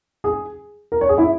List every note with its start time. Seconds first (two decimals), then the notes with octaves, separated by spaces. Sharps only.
0.24 G#4
0.92 A#4
1.01 C#5
1.09 G#4
1.18 E4